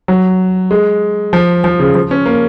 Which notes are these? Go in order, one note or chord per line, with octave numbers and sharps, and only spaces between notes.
F#3
G#3
F3
F3
C#3
F3
C#4
A#3